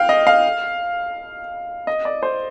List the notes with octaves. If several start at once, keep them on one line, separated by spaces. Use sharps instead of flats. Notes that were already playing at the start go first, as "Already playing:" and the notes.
Already playing: F5 G5
D#5
F5
D#5
D5
C5